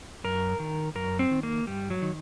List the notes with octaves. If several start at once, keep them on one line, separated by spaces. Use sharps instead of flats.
F#2 A#4
D#3
F#2 A#4
C4
D#3
A#3
G2 G3
F#3
D#3